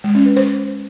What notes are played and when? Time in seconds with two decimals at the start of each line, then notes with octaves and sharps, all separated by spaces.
0.04 G#3
0.15 C#4
0.26 B4
0.36 C5